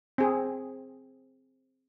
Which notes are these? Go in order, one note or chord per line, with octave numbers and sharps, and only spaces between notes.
C4 G#4